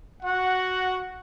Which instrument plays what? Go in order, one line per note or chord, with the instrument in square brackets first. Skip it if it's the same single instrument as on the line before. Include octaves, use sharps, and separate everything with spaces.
[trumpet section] F#4 F#5